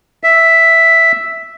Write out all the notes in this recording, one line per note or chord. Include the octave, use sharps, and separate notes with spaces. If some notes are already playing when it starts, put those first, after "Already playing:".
E5